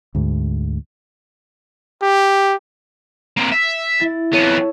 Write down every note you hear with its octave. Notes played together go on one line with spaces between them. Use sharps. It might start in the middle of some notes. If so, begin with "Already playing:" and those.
D2 G#2
G4
A#3 C4
E5
E4 A6
F2 B3 A4 C#5